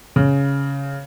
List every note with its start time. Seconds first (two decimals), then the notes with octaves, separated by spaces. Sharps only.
0.16 C#3